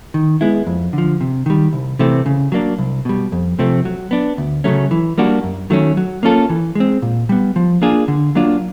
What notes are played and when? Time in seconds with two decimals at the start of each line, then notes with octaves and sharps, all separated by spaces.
0.14 D#3
0.41 G#3 B3 E4
0.67 F2
0.93 D3
0.98 F3
1.21 C3
1.46 D#3 G3
1.73 C2
1.99 C3 E3 A3 C4
2.26 C#3
2.52 F#3 A#3 D4
2.78 C2
3.05 B2 G3
3.32 F2
3.59 C3 F3 A3 C4
3.85 F#3
4.11 B3 D4
4.38 D2
4.64 C#3 F#3 A3 C#4
4.91 E3
5.18 G3 A#3 D4 F#4
5.44 F#2
5.70 D#3 F#3 A3 C#4
5.97 F#3
6.23 A#3 C#4 F4 A4
6.50 E3
6.75 G#3 C4
7.02 A#2
7.29 G3 B3
7.56 F3
7.82 A#3 D4 F4 G#4
8.08 D3
8.35 F#3 A#3 D4 F4